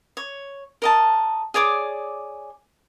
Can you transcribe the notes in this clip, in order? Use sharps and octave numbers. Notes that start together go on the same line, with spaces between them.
C#5
A#4 D#5 A5
G#4 C#5 D5 D6